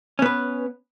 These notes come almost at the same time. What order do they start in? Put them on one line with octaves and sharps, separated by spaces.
C#4 B3 B4